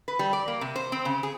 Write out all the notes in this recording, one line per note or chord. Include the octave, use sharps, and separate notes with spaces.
B4
G3
D5
A#3
C3
C5
C4
C#3
G#4